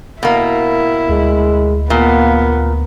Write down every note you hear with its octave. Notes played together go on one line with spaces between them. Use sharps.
B2 A#3 E4
D2 G#3
A#2 A#3 B3